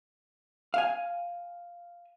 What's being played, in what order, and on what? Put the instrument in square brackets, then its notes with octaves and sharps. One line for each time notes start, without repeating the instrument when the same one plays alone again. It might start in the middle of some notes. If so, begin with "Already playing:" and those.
[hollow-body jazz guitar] F5 G#5